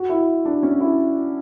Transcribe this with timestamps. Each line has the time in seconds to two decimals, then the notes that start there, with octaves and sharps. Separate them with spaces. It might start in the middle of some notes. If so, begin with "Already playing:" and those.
Already playing: F#4
0.09 E4
0.45 D4
0.63 C#4
0.80 E4